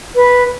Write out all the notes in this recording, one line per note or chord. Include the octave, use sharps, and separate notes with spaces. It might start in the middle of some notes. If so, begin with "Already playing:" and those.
B4